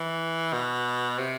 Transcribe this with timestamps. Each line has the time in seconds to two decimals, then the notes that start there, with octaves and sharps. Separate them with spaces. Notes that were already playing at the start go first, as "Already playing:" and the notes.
Already playing: E3
0.53 B2
1.18 C3